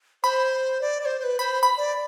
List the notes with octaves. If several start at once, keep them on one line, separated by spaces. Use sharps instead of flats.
C5 B5
D5
D5
C5
C5
B4
C5 B5
B5
D5